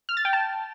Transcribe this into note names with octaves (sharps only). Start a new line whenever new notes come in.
F6
A6
G5
A5